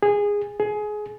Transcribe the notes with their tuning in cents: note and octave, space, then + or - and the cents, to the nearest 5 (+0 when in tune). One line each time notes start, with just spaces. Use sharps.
G#4 -15
G#4 +20